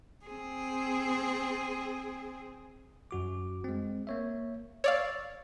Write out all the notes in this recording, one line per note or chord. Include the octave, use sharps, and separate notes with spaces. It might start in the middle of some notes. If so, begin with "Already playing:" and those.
C4 G#4
F#2 F#4 D6
G#3 C4
A#3 C#5 E5
C#5 D5 F5 C#6 E6 A6